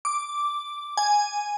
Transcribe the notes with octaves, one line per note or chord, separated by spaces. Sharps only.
D6
G#5